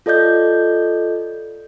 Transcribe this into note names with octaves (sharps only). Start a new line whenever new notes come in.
F4 A4 D5 D#5 G6